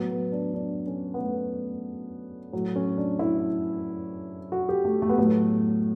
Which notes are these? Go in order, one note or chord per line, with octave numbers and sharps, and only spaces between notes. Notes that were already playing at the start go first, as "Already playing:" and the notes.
Already playing: A2 F#3 B3
B3
D4
D4
C#4
B3
A3
A2 F#3
C#4
D4
E4
F#4
G4
A3
A3
B3
A2 F#3 A3